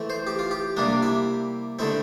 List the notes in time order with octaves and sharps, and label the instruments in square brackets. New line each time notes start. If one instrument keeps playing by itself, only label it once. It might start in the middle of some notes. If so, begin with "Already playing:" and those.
Already playing: [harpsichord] E3 A3 C4
C5
G4
F4
G4
C3 G3 A#3 D4
E4
D3 A3 C4 E4